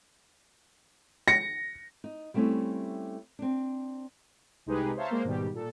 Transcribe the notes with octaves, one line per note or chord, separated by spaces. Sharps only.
A#6 C#7
D#4
G3 A3 C4 C#4 E4 G4
C4 D4
C2 G#3 D#4 G4 G#4 B4
C5 C#5 E5 F5 A5 A#5
G#3 A#3 C5
G#2 B2 D#3 G3 G4
A#2 A4